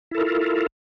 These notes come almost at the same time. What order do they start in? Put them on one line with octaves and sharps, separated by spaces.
E4 A4 A#4 F4